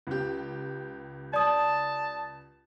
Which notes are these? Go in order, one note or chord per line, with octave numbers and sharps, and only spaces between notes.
C#2 G4
D5 A5 D#6